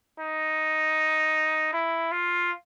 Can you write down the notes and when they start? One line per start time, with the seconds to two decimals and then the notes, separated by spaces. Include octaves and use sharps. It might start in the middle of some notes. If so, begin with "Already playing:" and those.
0.20 D#4
1.73 E4
2.11 F4